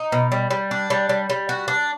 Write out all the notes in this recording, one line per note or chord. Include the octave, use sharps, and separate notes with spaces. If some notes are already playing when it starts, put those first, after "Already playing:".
Already playing: D#4
B2
G3
G3
D4
G3
G3
G3
F#4
D4